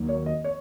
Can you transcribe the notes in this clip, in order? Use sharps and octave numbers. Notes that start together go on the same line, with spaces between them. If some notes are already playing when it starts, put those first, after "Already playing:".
Already playing: D#2 D#3 F#3 A#3
C#5
D#5
C#5